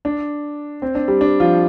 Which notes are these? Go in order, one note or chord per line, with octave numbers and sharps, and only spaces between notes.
D4
C4
D4
G3 G4
D4
F3 F4